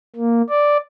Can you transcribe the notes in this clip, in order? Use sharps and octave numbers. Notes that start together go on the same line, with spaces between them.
A#3
D5